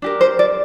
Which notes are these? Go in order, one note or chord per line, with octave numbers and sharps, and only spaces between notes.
D4 G4 A#4
C5
D5